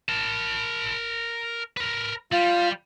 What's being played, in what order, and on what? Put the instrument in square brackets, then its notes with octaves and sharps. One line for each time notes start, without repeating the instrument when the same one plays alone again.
[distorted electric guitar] A#4 A5
A#4 B4
[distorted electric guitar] G3 [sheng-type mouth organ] F4